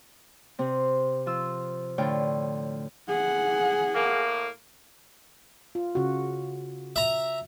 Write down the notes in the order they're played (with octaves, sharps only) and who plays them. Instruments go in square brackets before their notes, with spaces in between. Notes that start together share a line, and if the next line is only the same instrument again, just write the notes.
[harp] C3 C4
F3 F4 E6
A2 D3 F4 C#5 G5
[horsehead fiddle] G#4 F#5
[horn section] A2 A#3
[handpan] F4
C#3 F#4
[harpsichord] E5 A#5